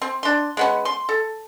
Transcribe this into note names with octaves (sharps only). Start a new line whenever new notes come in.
C4
D4 C6
G#3 B3 C#4
C6
A4